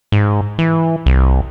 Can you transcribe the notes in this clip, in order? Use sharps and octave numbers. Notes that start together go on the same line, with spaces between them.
G#2
E3
C2